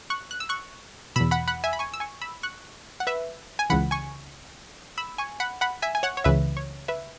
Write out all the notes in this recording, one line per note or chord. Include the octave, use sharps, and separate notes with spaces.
C#6 F#6
F#6
E6
C#6 F#6
E2 B2 B5 E6
F#5 B5
F#5 B5
E5 G#5
B5
G#5 C#6
E6
G#5 C#6
B5 E6
C#6 F#6
F#5
B4 E5
G#5
C#2 C#3 E3 F#5 B5
G#5 C#6
B5 E6
G#5 C#6
F#5 B5
F#5 B5
E5 G#5
G#5
C#5 F#5
C#5
C#2 C#3 E3 B4 E5
C#5
B4 E5